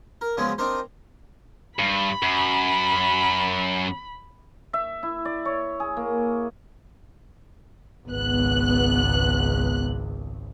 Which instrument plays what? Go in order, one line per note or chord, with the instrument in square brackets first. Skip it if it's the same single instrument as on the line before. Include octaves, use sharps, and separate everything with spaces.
[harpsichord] A#4
C#3 F3 F#3 G#3 B3 G#4
C4 D4 D#4 A#4 C5
[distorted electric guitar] G2 [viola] B5
[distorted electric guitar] F#2
[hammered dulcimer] E5
E4
D5
C#5
G#4
A#3
[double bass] G#1 C#2 [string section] B3 F#6